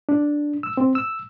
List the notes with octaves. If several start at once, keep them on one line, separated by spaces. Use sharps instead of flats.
D4
E6
C4
E6